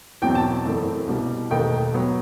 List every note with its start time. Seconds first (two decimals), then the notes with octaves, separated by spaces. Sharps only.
0.22 E2 B2 F#3 C4 G5
0.35 A5
0.65 F#1 F#2 E3 A3 C4
1.07 C2 B2 G3
1.50 E1 D#2 D#3 A3 D#4 G5
1.94 F#3 B3